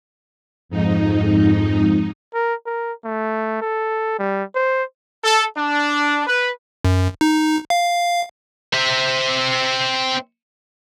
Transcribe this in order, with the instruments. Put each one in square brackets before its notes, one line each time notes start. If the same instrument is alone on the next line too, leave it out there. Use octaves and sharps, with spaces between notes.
[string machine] F2 G#2 D#4
[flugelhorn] A#4
A#4
A3
A4
G3
C5
[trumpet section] A4
D4
B4
[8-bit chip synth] F#2
D#4
F5
[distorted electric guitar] C4 E5